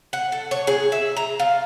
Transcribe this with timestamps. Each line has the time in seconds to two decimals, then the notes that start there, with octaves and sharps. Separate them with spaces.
0.13 F#5
0.32 A4
0.51 C#5
0.67 G#4
0.92 E5
1.17 A#5
1.39 F4